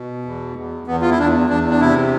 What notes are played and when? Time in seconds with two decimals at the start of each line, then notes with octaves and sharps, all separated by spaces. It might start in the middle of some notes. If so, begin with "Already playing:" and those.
Already playing: B2
0.25 E2
0.56 E2
0.87 E2 B3
1.02 F4
1.10 E4
1.19 E2 D4
1.50 E2 D4
1.70 D4
1.81 C3 E4